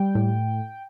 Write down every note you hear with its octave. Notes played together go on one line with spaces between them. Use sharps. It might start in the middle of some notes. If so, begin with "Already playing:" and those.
Already playing: G3 G5
A2